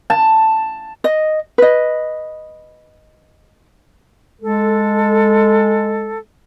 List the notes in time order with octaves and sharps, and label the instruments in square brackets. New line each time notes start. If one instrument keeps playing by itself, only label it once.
[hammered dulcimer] A5
[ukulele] D#5
B4 D#5
[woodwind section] G#3 A4